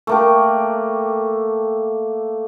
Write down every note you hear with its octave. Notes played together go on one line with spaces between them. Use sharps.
A3 A#3 G4